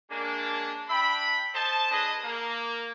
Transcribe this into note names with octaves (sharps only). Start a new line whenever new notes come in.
G#3 A#3 C#4 D4
D4 E5 G5 B5
A4 C5 D#5 A5
D4 G#4 B4 D#5
A#3